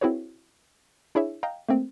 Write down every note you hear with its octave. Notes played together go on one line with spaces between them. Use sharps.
C4 E4 F#4 G#4 B4 C#5
D4 E4 G#4 C#5 E5
D#5 F5 G5 A#5
A3 A#3 C4